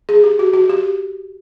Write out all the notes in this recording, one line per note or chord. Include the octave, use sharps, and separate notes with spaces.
G#4
G4
F#4
F#4
G4